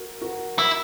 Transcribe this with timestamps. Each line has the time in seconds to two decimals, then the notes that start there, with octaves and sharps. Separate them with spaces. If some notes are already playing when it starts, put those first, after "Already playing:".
Already playing: F#4 A#4
0.21 F#4 A#4
0.59 E4